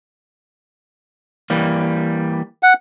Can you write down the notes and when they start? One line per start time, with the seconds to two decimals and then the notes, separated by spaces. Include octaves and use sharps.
1.50 E3 G3 A#3
2.63 F#5